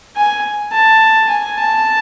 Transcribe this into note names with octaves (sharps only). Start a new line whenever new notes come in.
G#5
A5
G#5
A5